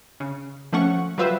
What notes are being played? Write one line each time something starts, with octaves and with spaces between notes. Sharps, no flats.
C#3
F3 A3 C#4 F#5 C#6
F#3 G3 F4 B4 C5 E5